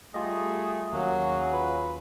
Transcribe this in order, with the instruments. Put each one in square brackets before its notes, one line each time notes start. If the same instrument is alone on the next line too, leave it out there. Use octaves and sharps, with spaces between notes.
[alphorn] G3 [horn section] A3 [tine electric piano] F4 G4 D#5 [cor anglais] G#4
[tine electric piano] D#2 [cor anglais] F#3 [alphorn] A#3 [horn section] C#4 F#4 G#4
[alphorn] F4 [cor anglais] B4